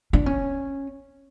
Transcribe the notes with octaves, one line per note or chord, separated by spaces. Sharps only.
D4
C#4